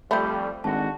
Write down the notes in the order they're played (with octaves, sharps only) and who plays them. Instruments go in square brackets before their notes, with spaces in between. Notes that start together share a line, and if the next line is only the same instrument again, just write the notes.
[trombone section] F2 G3 [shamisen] A3 C4 [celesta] B5 G6
[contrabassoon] G#1 [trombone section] D3 F#4 [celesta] A5